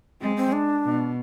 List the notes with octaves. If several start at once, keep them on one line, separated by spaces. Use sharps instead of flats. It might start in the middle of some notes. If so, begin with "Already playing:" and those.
G#3 C4
C4
D4
B2